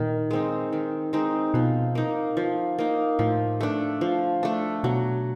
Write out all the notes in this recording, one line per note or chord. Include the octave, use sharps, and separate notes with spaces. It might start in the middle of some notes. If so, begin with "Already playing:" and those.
Already playing: A#2 D#3
G#3 C4 D#4
D#3
G#3 C4 D#4
B2 F3
A#3 D#4
F3
A#3 D#4
A2 F3
A3 D4
F3
A3 D4
B2 F#3